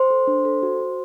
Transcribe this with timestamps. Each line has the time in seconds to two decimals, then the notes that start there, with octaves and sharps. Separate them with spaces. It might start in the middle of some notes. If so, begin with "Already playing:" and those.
Already playing: C5 C6
0.10 A4
0.27 D4
0.45 A4
0.63 F#4
0.80 F#4